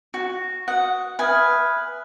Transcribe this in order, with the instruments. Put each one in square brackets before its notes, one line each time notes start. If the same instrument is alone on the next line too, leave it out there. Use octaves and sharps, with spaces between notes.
[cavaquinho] F#4
[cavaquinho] F#5 [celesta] D#6
[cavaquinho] B4 G#5 [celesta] E5 D#6 F6